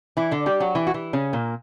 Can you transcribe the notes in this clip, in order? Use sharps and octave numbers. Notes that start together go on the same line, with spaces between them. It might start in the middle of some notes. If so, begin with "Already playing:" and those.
E3 E4
D3 D4
G3 G4
F#3 F#4
E3 E4
F#4
E3 E4
C#3 C#4
A#2 A#3